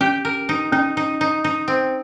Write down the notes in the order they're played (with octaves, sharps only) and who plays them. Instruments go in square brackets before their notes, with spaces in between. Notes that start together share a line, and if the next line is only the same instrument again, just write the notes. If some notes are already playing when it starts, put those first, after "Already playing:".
[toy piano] C#4 [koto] G4
[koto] A#4
D#4
[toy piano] C#4 [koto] D#4
[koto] D#4
D#4
D#4
C4